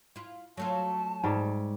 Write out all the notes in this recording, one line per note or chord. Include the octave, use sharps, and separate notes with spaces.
E4 F4
F#3 A3 F4 A5
G#2 G3 C#5